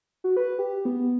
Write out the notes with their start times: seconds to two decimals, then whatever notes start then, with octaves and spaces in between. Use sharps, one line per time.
0.24 F#4
0.37 B4
0.59 G4
0.85 B3